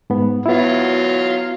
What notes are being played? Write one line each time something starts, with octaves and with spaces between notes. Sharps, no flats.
G#2 B3
F#3 B3 E4 F4